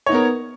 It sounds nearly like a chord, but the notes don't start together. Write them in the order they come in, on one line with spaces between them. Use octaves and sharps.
C#5 D#4 B3 A#4